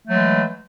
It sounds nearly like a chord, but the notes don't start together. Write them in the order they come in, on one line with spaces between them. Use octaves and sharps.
A3 F#3 G#3 E3